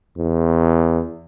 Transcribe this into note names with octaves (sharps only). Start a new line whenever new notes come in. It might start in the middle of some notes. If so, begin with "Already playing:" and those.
E2